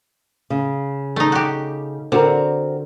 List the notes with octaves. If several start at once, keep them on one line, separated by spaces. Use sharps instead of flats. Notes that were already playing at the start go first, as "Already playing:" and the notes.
C#3
A3 D#4
F#4 G4
D3 C4 F#4 A#4